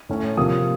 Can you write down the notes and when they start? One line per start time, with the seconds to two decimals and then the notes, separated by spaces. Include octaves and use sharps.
0.09 A2 A3 C#4
0.37 C3 F3 A#3 D#6